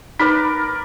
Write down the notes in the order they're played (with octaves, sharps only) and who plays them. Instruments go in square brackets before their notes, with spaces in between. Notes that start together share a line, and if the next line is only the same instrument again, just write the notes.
[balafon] D#4 [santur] A#4 B4 D5